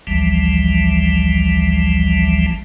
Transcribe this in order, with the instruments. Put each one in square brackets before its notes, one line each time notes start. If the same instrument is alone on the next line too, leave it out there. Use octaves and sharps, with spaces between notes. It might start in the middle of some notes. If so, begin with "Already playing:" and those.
[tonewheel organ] A1 D2 E3 F3 G3